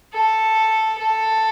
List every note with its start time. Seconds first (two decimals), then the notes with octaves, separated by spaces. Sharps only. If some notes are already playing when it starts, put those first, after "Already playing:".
0.14 A4
0.99 A4